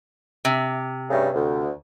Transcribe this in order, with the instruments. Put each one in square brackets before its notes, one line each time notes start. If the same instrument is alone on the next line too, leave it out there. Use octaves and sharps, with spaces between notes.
[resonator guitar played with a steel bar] C3
[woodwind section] G2 C#3 A3
D2